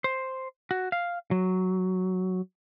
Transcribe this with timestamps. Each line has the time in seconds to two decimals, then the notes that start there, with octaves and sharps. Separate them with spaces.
0.04 C5
0.71 F#4
0.92 F5
1.31 F#3